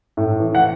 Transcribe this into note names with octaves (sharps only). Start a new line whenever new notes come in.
A2
E3
F#5